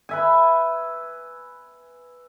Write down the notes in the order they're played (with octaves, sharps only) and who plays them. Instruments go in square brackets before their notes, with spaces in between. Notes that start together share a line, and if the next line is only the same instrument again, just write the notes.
[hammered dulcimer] B4 E5 G#5